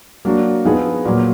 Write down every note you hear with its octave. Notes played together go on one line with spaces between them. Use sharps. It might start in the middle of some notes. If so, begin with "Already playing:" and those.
F#3 A#3 D4 F#4
F3 B3 D#4 G#4
A#2 F#3 A#3